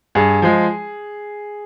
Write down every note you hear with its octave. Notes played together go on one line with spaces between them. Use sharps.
G2 G#4
F3 G#3